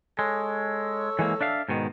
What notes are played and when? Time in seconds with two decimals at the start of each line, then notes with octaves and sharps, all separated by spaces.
0.19 G#3 A4 C#5
1.19 E3 G#3 A#3
1.41 D4 E5 F5
1.69 G#2 B2 D#3